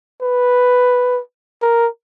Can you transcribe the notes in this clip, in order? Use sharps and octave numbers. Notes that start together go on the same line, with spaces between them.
B4
A#4